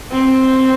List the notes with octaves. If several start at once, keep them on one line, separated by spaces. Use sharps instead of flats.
C4